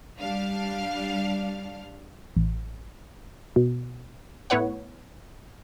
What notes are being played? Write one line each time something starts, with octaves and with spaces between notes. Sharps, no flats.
G3 D4 F5
A1
B2
A2 B3 E4 B4 C#5 F#5